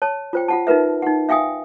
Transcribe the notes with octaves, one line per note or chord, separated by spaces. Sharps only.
C#5 A5
F4 C5 G5
F4 F#5 A5
D#4 F4 A#4 B4 E5
D#4 F#5
E5 F5 G5 G#5 D#6